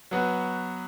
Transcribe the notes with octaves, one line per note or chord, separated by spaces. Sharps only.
F#3 B3 F#4 B4